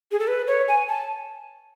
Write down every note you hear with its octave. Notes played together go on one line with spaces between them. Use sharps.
G#4
A4
B4
C#5
G#5
A5